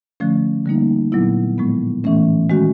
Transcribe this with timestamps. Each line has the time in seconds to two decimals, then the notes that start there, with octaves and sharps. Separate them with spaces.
0.20 D3 F3 A3 C#4
0.66 D3 G3 A#3 D#4
1.12 A#2 F#3 B3 E4
1.58 A2 F3 G#3 B3
2.04 A2 E3 A3 C#4
2.50 D#3 G#3 C#4 F#4